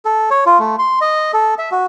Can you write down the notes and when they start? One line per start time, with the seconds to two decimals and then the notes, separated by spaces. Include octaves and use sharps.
0.05 A4
0.31 C#5
0.46 F4
0.59 A3
0.79 C6
1.01 D#5
1.33 A4
1.59 E5
1.71 F#4